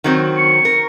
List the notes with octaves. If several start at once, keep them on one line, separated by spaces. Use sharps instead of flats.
D#3 F#3 C4
C#6
A#4